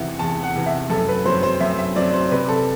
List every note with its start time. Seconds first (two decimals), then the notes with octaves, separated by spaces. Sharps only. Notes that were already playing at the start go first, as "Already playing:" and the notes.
Already playing: E2 C3 E3 E5 F#5
0.19 E2 A5
0.43 F#5
0.55 C3 E3
0.66 E5
0.90 F#2 A4
1.08 B4
1.25 F#3 C4 C5
1.43 C5
1.60 F#2 E5
1.78 E5
1.96 F#3 C4 D5
2.13 C5
2.31 C3 B4
2.49 A4